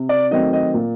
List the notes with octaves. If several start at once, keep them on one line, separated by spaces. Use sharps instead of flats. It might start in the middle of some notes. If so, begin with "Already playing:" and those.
Already playing: C3
D5
D#3 F#3 A3 C4 D#5
D#5
A#2